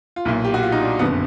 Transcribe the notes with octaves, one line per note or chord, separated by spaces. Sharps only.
F4
B1 A#2 E4
G4
F#4
F4
D#4
D4
F#1 F2 D3 B3